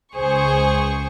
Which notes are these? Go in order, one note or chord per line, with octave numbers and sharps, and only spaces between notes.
C#2 G#4 C5 C#6